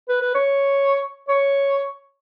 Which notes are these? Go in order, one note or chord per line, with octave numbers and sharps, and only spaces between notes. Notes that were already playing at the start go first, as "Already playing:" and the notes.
B4
B4
C#5
C#5